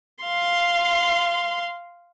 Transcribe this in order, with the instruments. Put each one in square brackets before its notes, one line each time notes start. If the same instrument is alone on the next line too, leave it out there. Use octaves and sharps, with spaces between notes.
[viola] F5 C6